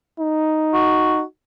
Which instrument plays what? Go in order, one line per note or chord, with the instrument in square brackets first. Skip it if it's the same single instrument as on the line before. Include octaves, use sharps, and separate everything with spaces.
[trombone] D#4
[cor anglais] F#4